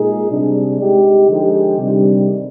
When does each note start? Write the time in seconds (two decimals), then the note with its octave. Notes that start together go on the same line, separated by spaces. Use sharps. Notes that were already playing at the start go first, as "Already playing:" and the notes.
Already playing: A#2 G#3 D#4 G#4
0.28 C3 G3 D4
0.78 G#3 D#4 G4
1.28 D3 F3 G#3 D#4 G4
1.78 C3 D#3 G3 D4